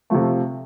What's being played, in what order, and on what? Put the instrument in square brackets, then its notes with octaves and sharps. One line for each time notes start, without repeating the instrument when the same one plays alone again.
[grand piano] C3 F3 A3